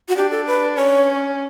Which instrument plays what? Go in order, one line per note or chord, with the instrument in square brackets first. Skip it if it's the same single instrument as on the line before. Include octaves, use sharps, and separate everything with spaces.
[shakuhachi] F#4
[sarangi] D4 [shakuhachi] G4
[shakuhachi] A4
B4
[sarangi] C#4 [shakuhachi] C#5